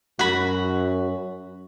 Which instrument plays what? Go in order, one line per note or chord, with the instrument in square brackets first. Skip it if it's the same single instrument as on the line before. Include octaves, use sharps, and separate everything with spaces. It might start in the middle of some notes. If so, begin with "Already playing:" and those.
[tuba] F#2 [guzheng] F#4 B5